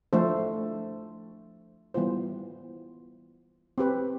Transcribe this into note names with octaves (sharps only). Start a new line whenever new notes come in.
F3 A3 D4 A4 C5
E3 G3 B3 F4 C5
C4 G4 B4